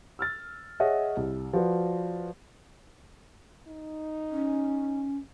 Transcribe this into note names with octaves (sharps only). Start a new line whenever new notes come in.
E6 F6 A6
G#4 C#5 D#5 E5 F#5
C2
F3 F#4 B4 D5
D#4
C#4